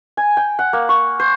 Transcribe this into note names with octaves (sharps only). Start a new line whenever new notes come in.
G#5
G5
F#5
A#3
C#6
C5